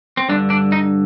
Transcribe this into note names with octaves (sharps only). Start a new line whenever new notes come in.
C4
G2 D3 D4
D4
D#4